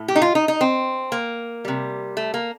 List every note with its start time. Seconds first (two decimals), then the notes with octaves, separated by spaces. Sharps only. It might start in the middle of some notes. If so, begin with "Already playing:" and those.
Already playing: A2 A3
0.08 G4
0.16 D#4
0.22 F4
0.35 D#4
0.48 D#4
0.61 C4
1.12 A#3
1.65 C3 G3
2.17 A3
2.34 A#3